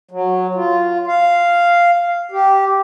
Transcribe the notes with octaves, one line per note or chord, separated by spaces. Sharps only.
F#3
F4
F5
G4